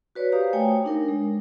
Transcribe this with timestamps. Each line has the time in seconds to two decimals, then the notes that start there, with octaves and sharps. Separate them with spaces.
0.15 F#4 B4 C#5 D5
0.32 G4 C5 F5 A#5 D#6
0.53 A3 C#5 G5 G#5
0.85 D4 D#4 A#4
1.08 G#3